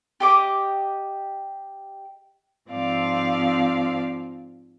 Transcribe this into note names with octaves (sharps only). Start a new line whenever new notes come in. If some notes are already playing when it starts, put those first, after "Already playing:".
G4 D#5 D6
G#2 F3 C4 D5 F5